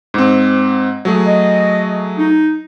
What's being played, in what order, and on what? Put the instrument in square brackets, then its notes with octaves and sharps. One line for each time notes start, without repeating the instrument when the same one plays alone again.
[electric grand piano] G#2 C4
F#3 A3 G#4
[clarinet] D#5
D#4